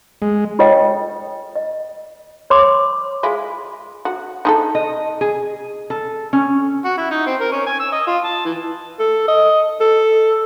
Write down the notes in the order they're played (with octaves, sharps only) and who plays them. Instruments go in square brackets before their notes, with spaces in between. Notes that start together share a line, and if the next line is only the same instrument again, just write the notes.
[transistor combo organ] G#3
[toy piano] F4 A4 C#5 D#5 G5
D#5
C#5 C6 D6
[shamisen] G#3 E4 F4
F#4
D#4 G#4 A4
[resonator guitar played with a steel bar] D#5
G#4
A4
C#4
[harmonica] F#4
E4
D#4
C4
A#4
C#4
G#5
E6
D#5
F4
A5
E3
[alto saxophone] A4
D#5
A4